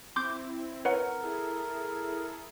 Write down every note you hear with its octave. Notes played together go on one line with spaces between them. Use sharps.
C4 E4 C6 D6 G6
A#4 B4 C#5 F#5
E4 G#4 A4